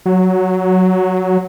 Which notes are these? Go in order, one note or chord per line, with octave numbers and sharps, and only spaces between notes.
F#3